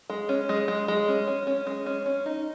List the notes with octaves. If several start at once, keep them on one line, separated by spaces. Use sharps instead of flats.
G#3
C#4
G#3
G#3
G#3
C#4
C#4
C#4
G#3
C#4
C#4
D#4